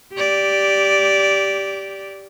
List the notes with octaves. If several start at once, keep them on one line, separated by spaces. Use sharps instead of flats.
G4 D5